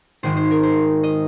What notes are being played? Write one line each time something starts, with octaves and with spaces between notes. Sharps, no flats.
G#1 G#2 D#3 G#3 C5
C5
A#4
C5
D#5